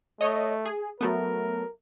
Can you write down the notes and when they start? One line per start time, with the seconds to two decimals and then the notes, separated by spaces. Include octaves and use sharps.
0.21 A3 C#5 D#5
0.65 G#4
1.01 F#3 A3 B3 A#4